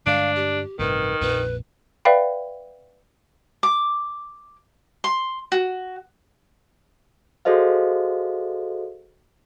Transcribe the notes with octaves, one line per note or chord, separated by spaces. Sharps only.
G2 D3 G#3 D4 F5
G4
A1 G2 C3 D#3 B4
A#1 F2 A#2 B4
B4 D5 E5 F5 G5 B5
D6
C6
F#4
F#4 G#4 A4 C5 D#5 F5